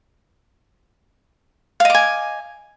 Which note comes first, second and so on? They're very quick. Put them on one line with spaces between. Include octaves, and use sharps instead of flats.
F5 D#5 D6 G#5